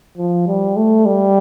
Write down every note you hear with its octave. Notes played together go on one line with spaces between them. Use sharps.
F3
G3
A3
G3